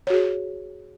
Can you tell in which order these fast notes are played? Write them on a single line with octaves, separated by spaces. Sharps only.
C#5 F#4 G#4